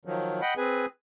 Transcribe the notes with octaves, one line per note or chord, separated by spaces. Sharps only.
D#3 F3 F#3
D#5 F#5 G5 B5
C4 G#4 B4 G#5